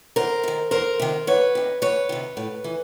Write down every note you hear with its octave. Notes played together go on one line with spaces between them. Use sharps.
E2 A#4 C5
C3
D#3
E2 A#4 C5
C3 D#3
E2 B4 C#5
C3 D#3
E2 B4 C#5
C3 D#3
A2
E3